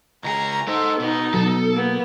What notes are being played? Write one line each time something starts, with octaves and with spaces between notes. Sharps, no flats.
C#2 G#4 A#5
D#4 A4 C5
B2 B3 D#4
B2 F#3 A4
A#3 B3